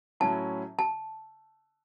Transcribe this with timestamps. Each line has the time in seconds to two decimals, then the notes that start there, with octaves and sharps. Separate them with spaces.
0.20 A2 F#3 C#4 E4 A5
0.79 A5